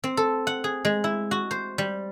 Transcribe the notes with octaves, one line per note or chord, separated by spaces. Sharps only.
C4
A4
F#5
G#4
G#3
E4
F#4
C5
G3